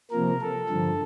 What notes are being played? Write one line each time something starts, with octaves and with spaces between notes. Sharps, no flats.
C3 F3 A#3 A#4
A4
G2 D3 F3